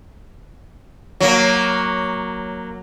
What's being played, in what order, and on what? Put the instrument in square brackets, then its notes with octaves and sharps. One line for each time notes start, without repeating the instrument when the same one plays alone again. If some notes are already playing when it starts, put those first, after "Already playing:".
[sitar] F#3 A#3